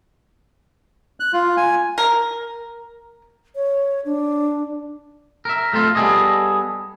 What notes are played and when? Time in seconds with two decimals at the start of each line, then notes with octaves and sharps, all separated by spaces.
1.20 F#6
1.33 F4
1.57 G#5
1.98 A#4
3.55 C#5
4.05 D4
5.45 A#4 E5
5.72 G3 A3 C4 F4
5.95 G3 B3 G#4 A4 D#5